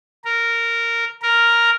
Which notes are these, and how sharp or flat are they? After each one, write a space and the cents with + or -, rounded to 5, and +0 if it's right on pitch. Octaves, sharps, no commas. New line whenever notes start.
A#4 -10
A#4 +0